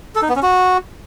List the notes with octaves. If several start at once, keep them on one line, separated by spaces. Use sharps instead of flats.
A4
D#4
B3
C#4
F#4